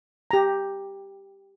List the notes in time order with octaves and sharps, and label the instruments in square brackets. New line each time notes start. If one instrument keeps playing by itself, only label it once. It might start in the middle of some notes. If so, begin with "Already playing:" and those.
[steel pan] G4 A#5